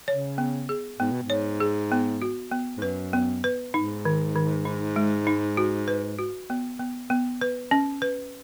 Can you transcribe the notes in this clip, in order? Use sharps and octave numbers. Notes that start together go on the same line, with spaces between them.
C#3 C#5
B3
G#4
G#2 B3
B2
G#2
C#5
G#4
B3
F#4
B3
G#2
F#2 B4
B3
B4
G#2 D#4
D#3
D#3
D#4
G#3
D#4
F#4
B4
F#4
B3
B3
B3
B4
C#4
B4